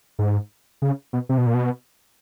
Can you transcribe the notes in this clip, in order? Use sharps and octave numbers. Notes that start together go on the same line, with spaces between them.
G#2
C#3
B2
C3
B2
A#2
B2